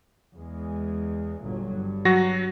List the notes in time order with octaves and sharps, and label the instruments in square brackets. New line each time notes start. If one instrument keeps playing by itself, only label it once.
[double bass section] E2 G#3
G1 A#2 F#3
G2
[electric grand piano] F#3 F#4 A#6